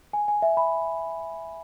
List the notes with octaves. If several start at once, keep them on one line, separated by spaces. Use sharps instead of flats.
G#5
G#5
E5
B5